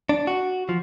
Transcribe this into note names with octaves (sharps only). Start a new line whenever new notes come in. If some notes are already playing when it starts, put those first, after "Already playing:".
D4
F#4
F3